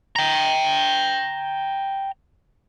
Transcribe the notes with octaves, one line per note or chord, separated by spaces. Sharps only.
G5 A#5